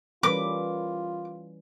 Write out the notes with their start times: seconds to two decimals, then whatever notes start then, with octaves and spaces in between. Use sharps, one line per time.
0.23 E3 G3 C#4 F4 A#4 B4 D6